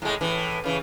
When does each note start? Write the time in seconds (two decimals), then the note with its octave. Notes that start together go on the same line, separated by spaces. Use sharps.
0.02 A2 G#3
0.21 A2 E3
0.64 C#3 E3